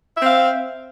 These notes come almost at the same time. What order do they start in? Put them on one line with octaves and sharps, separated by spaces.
E5 C4 F5